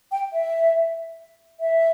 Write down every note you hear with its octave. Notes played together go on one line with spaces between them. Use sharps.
G5
E5
E5